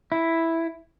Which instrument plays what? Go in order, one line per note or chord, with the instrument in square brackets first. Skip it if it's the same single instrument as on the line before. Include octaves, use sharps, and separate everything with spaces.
[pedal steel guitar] E4